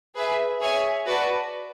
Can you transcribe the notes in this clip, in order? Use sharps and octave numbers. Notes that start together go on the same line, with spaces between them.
G#4 B4 E5
G#4 C#5 E5 G#5
F#4 B4 D5 A5